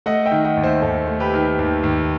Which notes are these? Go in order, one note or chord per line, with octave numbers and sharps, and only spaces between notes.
A3 D#5 F#5
E5 G5
D#3
D#5 F#5
D#2
C5 E5
D#2 A4 C5
A3
G4 B4
D#3
D#2
D#2